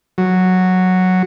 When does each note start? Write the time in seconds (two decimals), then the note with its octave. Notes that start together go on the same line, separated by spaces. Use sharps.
0.18 F#3